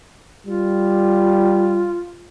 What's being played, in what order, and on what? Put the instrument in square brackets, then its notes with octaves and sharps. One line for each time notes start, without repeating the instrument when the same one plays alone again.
[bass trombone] G3 [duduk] F4